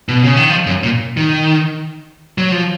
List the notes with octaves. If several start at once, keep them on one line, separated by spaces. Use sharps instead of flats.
B2
C#3
D#3
F3
F#2
A#2
D#3
F#3
F3